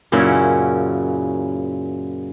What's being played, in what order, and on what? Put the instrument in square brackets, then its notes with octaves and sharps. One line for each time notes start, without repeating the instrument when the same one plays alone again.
[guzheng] F#2 A#2 C#3 C#4 E4